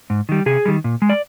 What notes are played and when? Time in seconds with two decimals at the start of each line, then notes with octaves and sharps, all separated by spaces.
0.10 G#2
0.29 D#3 G3
0.46 C3 G#4
0.65 D#3 G3
0.84 A#2
1.02 G#3
1.10 D5